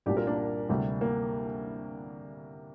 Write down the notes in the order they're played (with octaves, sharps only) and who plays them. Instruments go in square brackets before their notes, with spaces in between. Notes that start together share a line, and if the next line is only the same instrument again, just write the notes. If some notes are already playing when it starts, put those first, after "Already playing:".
[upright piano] C2 A#2 G3 D4 G4
F4 A#4
A#3 D4
D2 C3 G3
A#3